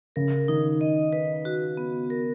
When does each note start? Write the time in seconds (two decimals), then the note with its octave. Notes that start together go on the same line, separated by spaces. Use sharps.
0.16 C#3 A#4
0.48 D#3 D#4
0.81 D#5
1.13 B4
1.45 F#4
1.77 B3
2.10 A#4